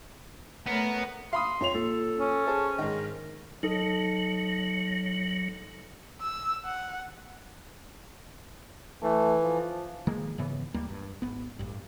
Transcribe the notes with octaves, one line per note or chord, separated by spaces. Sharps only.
A3 B3 A#4 C#5
F5 B5 C6 D#6
F2 C#5 F7
A#2 A4
C#4
G#4 C5 A5
G#2 D#3 A#4
F#3 D#4 A4
E6
F#5
E3 A3
F3
D#3 F3 G#3 A#3
G#2 C#3 E3 B3
D#2 G3 A#3
G2
G#1 B3
A1 G2